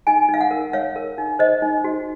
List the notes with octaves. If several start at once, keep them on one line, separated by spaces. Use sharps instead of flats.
D#4 G#5
D#4 F5
F#5
A#4
C#5 F5
A#4
D#4
C5 D#5
D#4
F#4